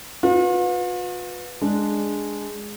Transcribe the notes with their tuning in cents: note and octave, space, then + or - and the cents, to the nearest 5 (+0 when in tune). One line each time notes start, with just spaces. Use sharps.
F4 +45 B4 +0
G#3 +0 D4 +0